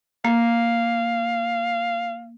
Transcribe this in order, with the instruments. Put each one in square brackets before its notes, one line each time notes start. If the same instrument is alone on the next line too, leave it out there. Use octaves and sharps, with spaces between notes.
[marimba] A#3 [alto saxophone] F5